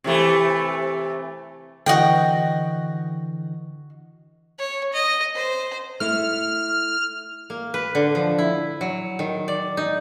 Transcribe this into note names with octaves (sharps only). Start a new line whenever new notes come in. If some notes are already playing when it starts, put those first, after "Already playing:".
C3 E3 A3
D3 E3 F#4 D#5 G5
C#5
D#5
C5
A3 E4 F6
A#3
B4
D3
F3
E4
F#3
D#3
D5
D#4